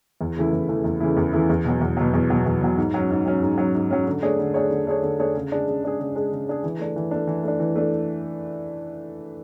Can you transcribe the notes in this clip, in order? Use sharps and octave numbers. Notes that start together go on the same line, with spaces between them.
E2
C#3 E3 A3 E4
E2
C#3 E3 A3 E4
E2
C#3 E3 A3 E4
E2
C#3 E3 A3 E4
E2
B2 F#3
E2
B2 F#3
E2
B2 F#3
E2
B2 F#3
G#2
F#3 C#4
G#2
F#3 C#4
G#2
F#3 C#4
G#2
F#3 C#4
D3
A3 D4 G#4 C#5
D3
A3 D4 G#4 C#5
D3
A3 D4 G#4 C#5
D3
A3 D4 G#4 C#5
C#3
G#3 D4 G#4
C#3
G#3 D4 G#4
C#3
G#3 D4 G#4
C#3
G#3 D4 G#4
E3
A3 D4
E3
A3 D4
E3
A3 D4
E3
A3 D4